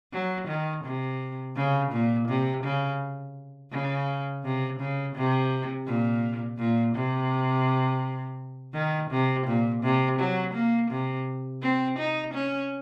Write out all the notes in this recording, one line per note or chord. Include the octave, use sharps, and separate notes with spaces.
F#3
D#3
C3
C#3
A#2
C3
C#3
C#3
C3
C#3
C3
A#2
A#2
C3
D#3
C3
A#2
C3
F#3
A#3
C3
C4
D#4
C#4